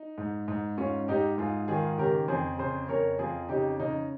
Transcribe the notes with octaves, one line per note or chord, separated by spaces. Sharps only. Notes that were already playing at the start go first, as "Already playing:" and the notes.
Already playing: D#4
G#2
G#2
G#2 C#4 F4
G#2 D#4 G4
G#2 F4 G#4
D#3 F4 G#4
C#3 G4 A#4
F2 G#4 C5
C#3 G#4 C5
F2 A#4 C#5
F2 F4 G#4
C#3 D#4 G4
C#3 D#4